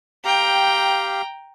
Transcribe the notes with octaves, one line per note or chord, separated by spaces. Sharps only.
G4 F5 G5 A#5